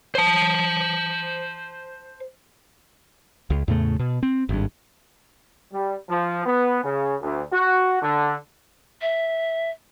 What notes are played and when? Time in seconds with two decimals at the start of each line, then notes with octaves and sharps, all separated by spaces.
0.15 C5 A5
3.50 C#2
3.68 E2 A2 C#3 A3
3.99 B2
4.23 C4
4.49 G#1 G2
5.72 G3
6.09 F3
6.46 B3
6.83 C#3
7.21 D2
7.53 F#4
8.02 D3
9.01 E5